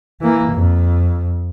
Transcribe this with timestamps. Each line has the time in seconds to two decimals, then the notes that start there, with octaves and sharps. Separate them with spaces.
0.21 E3 A#3
0.53 F2